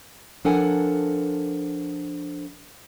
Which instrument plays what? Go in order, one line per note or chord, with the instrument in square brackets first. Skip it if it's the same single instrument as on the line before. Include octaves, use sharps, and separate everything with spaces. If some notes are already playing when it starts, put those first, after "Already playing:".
[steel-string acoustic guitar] F3 D4 A4 A#4 F#5 G#5